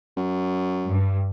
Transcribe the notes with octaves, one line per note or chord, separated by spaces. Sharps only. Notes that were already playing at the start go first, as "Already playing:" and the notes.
F#2
G2